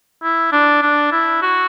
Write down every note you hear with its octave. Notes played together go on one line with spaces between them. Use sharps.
E4
D4
D4
E4
F#4